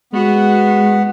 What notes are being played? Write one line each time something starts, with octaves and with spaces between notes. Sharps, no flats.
G#3 B3 F#4